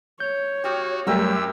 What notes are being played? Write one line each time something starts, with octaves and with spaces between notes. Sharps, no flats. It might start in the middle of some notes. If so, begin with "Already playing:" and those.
C#5 G6
F#4 G4 F5 D#6
F#2 F#3 G3 A3 G4 A#4 E5 E6